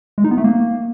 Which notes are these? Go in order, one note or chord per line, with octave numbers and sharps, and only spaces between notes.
G#3
D#4
B3
A3
A#3